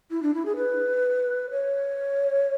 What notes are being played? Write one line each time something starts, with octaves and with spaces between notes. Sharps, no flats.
E4
D4
E4
G#4
B4
C#5